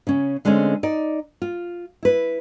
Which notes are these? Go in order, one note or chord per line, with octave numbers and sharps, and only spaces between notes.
C#3 C#4
D3 G#3 A3 C4 C#4
D#4 D5
F4
E4 B4